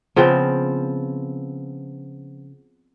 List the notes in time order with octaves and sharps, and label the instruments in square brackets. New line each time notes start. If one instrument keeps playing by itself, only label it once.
[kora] C#3 F3 B3 C4